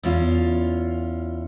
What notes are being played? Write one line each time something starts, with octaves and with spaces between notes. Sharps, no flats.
E2 C#4 F4